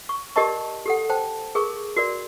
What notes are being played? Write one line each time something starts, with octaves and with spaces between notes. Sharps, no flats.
C#6
G4 A#4 D5 D#5 A5 C#6
G4 A4 F#5
C5 G5 A5
G#4 A#4 C#6
F#4 A#4 D5